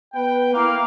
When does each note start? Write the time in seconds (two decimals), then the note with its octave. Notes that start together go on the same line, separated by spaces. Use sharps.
0.14 B3 B4 G5
0.54 A#3 E4 F5